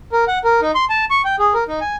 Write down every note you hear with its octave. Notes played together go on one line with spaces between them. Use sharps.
A#4
F#5
A#4
D#4
C6
A5
C#6
G5
G#4
A#4
D#4
G#5